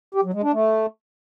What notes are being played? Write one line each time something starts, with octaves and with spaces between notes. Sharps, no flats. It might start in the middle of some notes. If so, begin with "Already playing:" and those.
G4
F#3
G#3
D4
A3